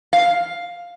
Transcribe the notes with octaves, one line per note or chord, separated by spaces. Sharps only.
F5